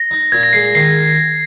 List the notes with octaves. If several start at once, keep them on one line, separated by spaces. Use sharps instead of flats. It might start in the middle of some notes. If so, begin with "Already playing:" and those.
Already playing: A#6
D#4
A#2 G#6
A#6
G#3 C7
D#3 C7